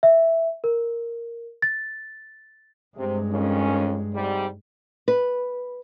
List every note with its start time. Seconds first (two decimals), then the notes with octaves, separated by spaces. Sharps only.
0.03 E5
0.64 A#4
1.62 A6
2.97 G2 C3 G#3
3.31 F2 D#3 C#4
4.14 G#2 C3 G3
5.08 B4